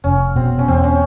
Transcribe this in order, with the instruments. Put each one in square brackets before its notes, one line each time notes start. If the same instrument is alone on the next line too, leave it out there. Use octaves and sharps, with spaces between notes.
[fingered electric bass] F1 [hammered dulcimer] C#4
[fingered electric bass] B2 [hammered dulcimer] C4
[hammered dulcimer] C#4
[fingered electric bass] E2 [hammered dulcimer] C4
[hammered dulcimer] C#4